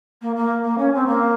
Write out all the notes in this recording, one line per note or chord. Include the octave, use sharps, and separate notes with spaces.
A#3
A#3
A#3
C#4
C4
A#3